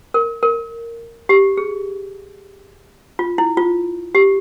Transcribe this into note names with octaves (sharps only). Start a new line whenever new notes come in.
A#4
A#4
G4
G#4
F4
E4
F4
G4